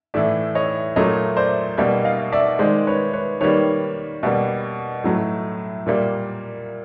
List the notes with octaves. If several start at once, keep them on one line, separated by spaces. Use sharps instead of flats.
A2 E3 A3 D5 E5
C#5 D#5
A#2 F#3 A3 C#5 D#5
C5 D5
B2 G3 A#3
D#5 F5
D5 E5
D#3 G#3 C5 D5
B4 C#5
B4 C#5
D#3 G3 A#3 B4 C#5
B2 G3 A#3
A2 F#3 A3
A#2 G3 A#3